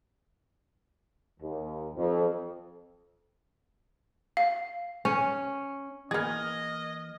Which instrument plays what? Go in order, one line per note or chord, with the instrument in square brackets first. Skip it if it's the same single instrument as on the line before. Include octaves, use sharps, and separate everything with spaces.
[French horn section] D#2
F2
[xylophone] F5
[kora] C#4
[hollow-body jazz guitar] E3 A#3 [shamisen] B3 G#4 [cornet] D#5 [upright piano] F6 G#6